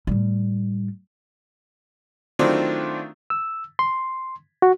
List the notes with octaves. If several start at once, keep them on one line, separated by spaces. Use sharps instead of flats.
A2 G3
D#3 F#3 A3 C4 D4 F4
E6
C6
F#4